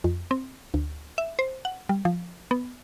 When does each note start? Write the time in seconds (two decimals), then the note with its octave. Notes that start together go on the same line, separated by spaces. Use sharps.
0.04 F2
0.31 C4
0.74 D2
1.18 E5
1.39 C5
1.65 F#5
1.89 G3
2.05 F3
2.51 B3